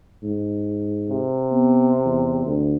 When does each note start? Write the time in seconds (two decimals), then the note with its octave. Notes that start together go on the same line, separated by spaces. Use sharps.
0.23 G#2
1.10 C3
1.52 B3
2.05 E2
2.47 D2